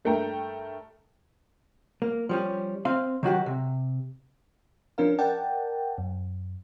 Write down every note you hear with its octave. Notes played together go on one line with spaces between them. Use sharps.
G2 A3 A#4 G5 A#5
A#3
F3 G3 C#4
C4 F5
D#3 F#3 F#4 G4
C3
F3 C#4 D4 A#4 F5
A#4 D5 F#5 G5 A5
F#2